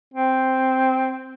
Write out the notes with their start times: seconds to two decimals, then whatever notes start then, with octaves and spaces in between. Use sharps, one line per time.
0.14 C4